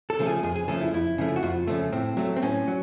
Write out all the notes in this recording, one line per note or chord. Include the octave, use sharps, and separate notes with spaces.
A4
C#3 F3 A3
G#4
F2 G#4
G#4
C#3 F3 A3 A4
E4
F2 E4
C#3 F3 A3
F#4
F2 F4
C#3 F3 A3
A2 C4
F#3 A3
C4
A2 C#4
F#3